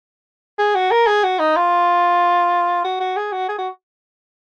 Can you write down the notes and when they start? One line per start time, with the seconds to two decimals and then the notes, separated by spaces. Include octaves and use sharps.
0.59 G#4
0.75 F#4
0.91 A#4
1.07 G#4
1.24 F#4
1.39 D#4
1.56 F4
2.84 F#4
3.00 F#4
3.17 G#4
3.32 F#4
3.49 G#4
3.59 F#4